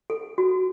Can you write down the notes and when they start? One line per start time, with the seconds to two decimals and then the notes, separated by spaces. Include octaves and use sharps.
0.10 A4
0.38 F#4